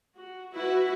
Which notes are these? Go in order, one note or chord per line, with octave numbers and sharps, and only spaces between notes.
F#4
E4 F#4 B4 E5